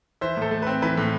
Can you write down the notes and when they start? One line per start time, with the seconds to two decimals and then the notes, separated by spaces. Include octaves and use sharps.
0.21 E3 C5 E5
0.37 A2 A4 C5
0.51 A3
0.62 C4 B4
0.82 E3 B4
0.97 A2